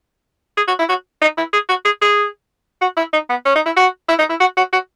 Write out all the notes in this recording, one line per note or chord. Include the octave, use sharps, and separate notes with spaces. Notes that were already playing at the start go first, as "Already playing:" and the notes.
G#4
F#4
E4
F#4
D#4
E4
G#4
F#4
G#4
G#4
F#4
E4
D#4
B3
C#4
D#4
E4
F#4
E4
D#4
E4
F#4
F#4
F#4